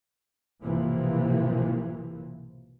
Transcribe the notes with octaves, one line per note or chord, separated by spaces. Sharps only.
B1 G#2 C3 E3 F3 A#3